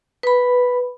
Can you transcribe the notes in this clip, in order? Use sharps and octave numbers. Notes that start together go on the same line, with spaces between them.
B4 B5